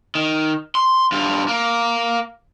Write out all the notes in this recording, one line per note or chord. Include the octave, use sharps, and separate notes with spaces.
D#3
C6
G2 F4
A#3